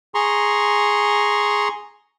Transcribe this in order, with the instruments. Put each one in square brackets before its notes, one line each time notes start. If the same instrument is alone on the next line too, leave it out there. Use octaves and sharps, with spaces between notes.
[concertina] G#4 A#5 C6 C#6